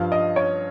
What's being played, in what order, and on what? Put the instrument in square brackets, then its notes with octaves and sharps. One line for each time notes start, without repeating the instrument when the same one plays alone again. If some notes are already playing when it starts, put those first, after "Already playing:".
Already playing: [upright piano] G2 F3 F5
D#5
C#5